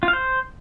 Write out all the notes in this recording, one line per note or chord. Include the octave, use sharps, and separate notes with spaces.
F4
F5
C5